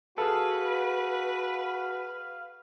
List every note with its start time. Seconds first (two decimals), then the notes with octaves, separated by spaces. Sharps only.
0.18 F#4 G#4 A4 B4 F5